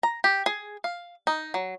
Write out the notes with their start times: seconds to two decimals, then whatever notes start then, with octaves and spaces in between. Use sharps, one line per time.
0.03 A#5
0.24 G4
0.46 G#4
0.84 F5
1.27 D#4
1.54 F#3